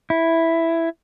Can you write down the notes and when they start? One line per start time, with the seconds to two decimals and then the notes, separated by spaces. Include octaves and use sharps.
0.10 E4